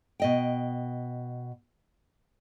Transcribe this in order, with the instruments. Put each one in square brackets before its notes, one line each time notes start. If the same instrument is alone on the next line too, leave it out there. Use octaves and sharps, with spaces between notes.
[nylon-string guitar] B2 D#5 G5